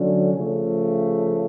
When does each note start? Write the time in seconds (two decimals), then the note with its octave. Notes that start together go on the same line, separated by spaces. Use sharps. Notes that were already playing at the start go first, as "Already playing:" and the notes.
Already playing: D3 F#3 A3 C#4
0.33 C#3 F3 A3